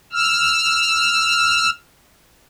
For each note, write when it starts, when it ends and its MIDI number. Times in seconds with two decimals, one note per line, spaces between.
0.12 1.70 88
0.12 1.70 89